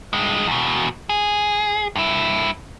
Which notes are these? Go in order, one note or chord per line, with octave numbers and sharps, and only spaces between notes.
G2 G#3
E2 B2
G#4
G2 E4